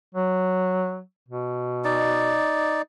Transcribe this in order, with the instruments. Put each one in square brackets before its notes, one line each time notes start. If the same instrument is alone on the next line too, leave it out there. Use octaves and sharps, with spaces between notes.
[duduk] F#3
B2
[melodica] D#4 D5